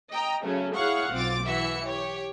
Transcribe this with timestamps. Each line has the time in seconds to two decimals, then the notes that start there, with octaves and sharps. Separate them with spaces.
0.10 D#5 G5 A#5
0.44 C#3 F#3 A3 C#4
0.74 E4 G#4 C#5 F5 F#5 C#6
1.12 B1 C4 F4 D6 A6
1.43 E3 F#4 E5 C#7
1.83 G4 C#5